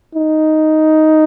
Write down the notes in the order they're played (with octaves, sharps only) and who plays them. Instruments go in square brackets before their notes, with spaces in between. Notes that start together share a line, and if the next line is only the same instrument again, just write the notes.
[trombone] D#4